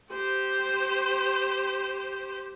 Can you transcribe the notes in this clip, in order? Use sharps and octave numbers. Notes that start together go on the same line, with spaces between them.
G4 C5